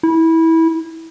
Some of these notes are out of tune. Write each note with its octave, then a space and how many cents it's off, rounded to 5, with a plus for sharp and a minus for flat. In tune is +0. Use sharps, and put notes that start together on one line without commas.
E4 -20